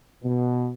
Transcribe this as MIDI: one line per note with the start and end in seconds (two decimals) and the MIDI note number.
0.24 0.72 47